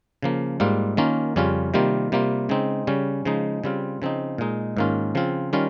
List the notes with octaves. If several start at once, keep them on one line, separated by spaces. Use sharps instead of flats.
C#3 F3 A#3
G#2 G3 A#3 F4
D#3 A#3 C#4 F4
F2 C#3 G3 C#4 F4
C3 D#3 G3 A#3 F4
C3 G3 A#3 F4
C#3 G#3 C4 D#4
C#3 G3 C#4
C#3 F3 G#3 D#4
C#3 G3 C4 F4
C#3 F3 C4 D#4
A#2 G#3 D#4
G#2 D#3 A#3 C#4 F4
C#3 F3 C4 F4
D#3 G3 C#4 F4